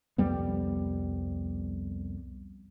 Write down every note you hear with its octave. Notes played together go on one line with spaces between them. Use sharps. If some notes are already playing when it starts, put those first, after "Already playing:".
C2 F2 G3 B3